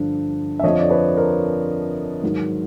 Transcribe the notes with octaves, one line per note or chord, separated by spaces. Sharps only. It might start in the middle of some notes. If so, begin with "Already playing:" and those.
Already playing: G2 D3 F3
E5
F2 D3 F3 C#5 D#5
D5
B4 C#5
A#4 C5
G#2 D#3 F#3